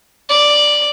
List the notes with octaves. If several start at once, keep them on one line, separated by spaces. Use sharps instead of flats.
D5